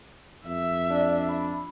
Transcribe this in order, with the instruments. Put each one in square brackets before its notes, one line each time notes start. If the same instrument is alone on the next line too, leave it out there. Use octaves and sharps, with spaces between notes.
[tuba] F2 [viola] E5
[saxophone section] D4 [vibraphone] D5
[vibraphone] B5